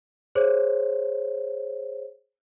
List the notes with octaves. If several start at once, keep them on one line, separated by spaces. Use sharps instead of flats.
G#4 C5 C#5